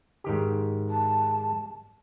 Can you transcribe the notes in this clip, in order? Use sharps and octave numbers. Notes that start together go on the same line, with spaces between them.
G#2 D#3 G4
A5